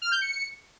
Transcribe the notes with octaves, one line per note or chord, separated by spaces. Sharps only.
F6
G6
C#7